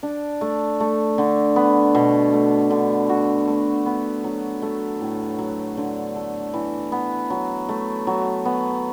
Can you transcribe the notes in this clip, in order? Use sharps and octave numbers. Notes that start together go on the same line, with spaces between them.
D4
A3
A3
D3
B3
B2
A3
D3
F#4
A3
B3
F#3
A3
A2
F#3
D3
A3
E3
B3
F#3
A3
F#3
B3